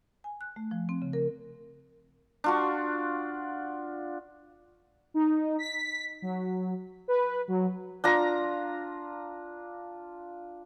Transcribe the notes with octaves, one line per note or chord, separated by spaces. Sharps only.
G#5
F#6
A3
F3
C4
C#3
A#4
D4 F4 F#4
D#4
B6
F#3
B4
F#3
D4 F4 A#5